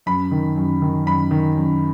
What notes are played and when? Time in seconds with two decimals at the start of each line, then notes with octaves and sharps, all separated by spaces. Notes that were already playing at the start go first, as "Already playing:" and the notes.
0.06 F#2 B5
0.31 D#3
0.56 F#2
0.82 D#3
1.06 F#2 B5
1.31 D#3
1.56 F#2